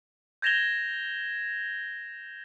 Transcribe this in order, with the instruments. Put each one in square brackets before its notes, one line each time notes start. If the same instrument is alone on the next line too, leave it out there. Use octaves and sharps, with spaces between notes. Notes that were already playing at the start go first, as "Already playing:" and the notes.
[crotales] G6 G#6 A#6 E7 F7 G7